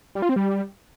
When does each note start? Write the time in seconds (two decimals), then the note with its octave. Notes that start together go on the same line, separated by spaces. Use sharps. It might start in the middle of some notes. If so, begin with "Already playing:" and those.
0.15 G3
0.22 F4
0.29 C4
0.36 G3